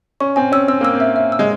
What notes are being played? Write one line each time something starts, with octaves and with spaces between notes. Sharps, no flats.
C#4 C#6
C4 G#5
C#4 E6
C4 E6
A#3 E6
C4
E5
E5
E6
G#3